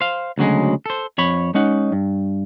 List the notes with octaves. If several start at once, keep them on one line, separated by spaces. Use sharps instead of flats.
C5 F5
D2 C#3 F#3 G#3
A4 C5
F2 C#5 B5
G#3 C#4 D#4 F#5
G2